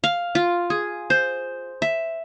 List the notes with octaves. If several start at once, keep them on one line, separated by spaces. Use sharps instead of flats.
F5
F4
G#4
C5
E5